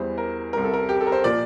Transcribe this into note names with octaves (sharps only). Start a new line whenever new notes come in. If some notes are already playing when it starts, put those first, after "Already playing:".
Already playing: E2 E3 G3 C5
A#4
C2 C3 G3 A#4
A4
A#4
G4
A4
A#4
C5
A#2 F3 D5